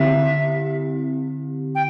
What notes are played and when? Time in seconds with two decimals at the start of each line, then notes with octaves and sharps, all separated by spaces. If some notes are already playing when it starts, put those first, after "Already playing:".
Already playing: D3 C4 E4 G4 E5
1.75 G5